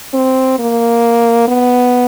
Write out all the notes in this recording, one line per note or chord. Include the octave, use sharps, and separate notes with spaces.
C4
A#3
B3